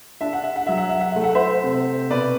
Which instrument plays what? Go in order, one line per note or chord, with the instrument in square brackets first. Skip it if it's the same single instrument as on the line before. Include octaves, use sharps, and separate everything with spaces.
[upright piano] D4 E5
F#5
E5
F#5
F#3 E5
F#5
E5
F#5
A3 E5
F#5
C5 E5
C3
B2 B4 D5